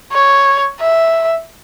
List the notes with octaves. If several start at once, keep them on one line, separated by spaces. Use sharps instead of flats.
C#5
E5